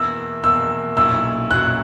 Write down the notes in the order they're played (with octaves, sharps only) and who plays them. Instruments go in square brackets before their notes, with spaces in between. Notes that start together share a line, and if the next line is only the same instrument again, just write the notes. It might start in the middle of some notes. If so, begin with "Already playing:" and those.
Already playing: [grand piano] E2 B2 A#3 E4 [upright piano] E6
[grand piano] E2 B2 A#3 E4 [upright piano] E6
[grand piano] B1 A#2 F#3 C#4 E4 [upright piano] E6
[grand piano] B1 A#2 F#3 C#4 E4 [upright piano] F#6